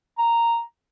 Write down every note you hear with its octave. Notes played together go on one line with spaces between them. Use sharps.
A#5